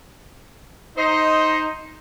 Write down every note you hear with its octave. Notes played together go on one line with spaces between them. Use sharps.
D#4 C5 D#5